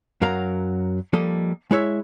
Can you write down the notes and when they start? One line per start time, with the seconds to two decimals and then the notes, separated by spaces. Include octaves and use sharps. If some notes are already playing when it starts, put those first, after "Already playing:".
0.21 F#2 F#3 A#4 F5 A#5
1.13 F3 G3 A#3 A4 D#5
1.71 G#3 E4 C#5 E5